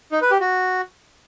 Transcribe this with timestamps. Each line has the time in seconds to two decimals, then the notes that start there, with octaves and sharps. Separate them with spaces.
0.12 D#4
0.21 B4
0.31 G4
0.40 F#4